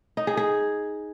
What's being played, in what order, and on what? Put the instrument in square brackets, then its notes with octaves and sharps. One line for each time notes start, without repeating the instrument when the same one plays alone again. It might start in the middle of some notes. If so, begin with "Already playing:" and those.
[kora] D#4
G#4
G#4